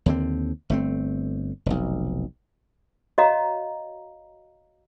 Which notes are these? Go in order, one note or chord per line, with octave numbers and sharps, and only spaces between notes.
D#2 D3 C4
G1 A3 C4
F1 B1
F#4 C#5 D#5 F5 A#5